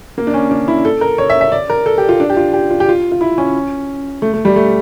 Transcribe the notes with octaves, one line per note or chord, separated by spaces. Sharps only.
A#3
D4
C#4
D4
E4
A4
A#4
C#5
E5
E5
D5
A#4
A4
G4
F4
D4
G4
F4
G4
F4
G4
F4
F4
E4
C#4
A3
A3
G3
A3